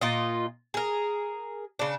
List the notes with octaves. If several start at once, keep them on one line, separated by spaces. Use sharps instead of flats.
A#2 F4 D#5
G#4 A#4
C#3 D4